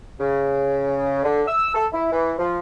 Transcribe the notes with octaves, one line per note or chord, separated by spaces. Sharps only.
C#3
D3
E6
A4
E4
E3
F3